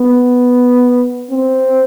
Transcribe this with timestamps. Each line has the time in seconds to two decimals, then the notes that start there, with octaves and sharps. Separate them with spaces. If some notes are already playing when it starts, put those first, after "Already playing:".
Already playing: B3
1.31 C4